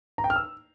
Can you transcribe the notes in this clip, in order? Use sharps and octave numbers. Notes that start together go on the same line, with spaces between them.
A#5
G5
F6
E6